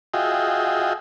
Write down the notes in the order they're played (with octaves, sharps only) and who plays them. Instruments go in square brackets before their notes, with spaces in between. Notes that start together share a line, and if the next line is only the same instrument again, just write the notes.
[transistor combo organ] F4 F#4 G#4 D#5 E5 G5